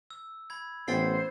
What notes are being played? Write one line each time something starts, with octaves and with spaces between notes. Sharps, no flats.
E6
B5 G#6
A1 B3 C5 E5 G5 E6 A6 C7